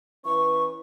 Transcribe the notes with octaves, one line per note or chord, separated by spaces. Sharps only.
E3 C#4 B4 C#6